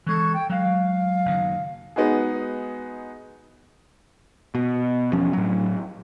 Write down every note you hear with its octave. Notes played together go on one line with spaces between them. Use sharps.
E3 G#3 A4 C#6 G#6
G5
F#3 G#3 F5
F#1 D#3 F#3
G#3 B3 D#4 F#4 G#4
B2
E1 F3 C#4
A2 F#3